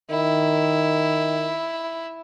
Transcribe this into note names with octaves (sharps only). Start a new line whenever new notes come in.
D#3 E4